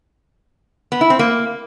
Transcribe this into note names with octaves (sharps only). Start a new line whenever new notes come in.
B3
E4
C4
A#3